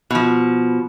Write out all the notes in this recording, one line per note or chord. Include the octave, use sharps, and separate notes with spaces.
B2 F3